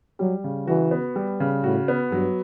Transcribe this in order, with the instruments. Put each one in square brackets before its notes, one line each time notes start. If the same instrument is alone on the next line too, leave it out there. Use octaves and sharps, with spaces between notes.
[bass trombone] F#3 [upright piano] G3
[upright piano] C#3
[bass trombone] E3 [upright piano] F#4
[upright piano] B3
G3
C#3
[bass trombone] A2 [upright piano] F#4
[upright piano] B3
[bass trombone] G2 [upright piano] F#3